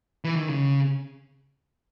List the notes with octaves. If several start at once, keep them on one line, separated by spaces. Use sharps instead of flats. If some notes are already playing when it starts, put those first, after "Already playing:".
E3
D#3
C#3